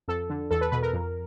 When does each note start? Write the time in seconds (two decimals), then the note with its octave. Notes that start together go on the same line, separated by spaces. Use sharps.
0.08 F2 A4
0.30 D3
0.51 E2 A4
0.61 B4
0.72 B2 B4
0.83 A#4
0.93 F2